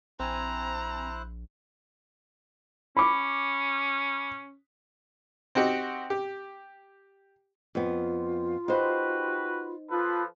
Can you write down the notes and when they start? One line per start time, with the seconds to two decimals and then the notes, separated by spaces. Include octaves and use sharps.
0.20 A#1 C4 E4 C5 G#5 A#5 F#6
2.97 C#4 B5 D6
5.55 C4 D#4 F#4 G4
6.10 G4
7.75 F2 B3 F4
8.68 D#4 F#4 G4 B4 C5
9.90 F3 F4 A4 B4